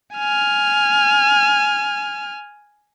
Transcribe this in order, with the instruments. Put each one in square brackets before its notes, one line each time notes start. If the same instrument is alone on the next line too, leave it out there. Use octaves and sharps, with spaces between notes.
[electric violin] G#5 F6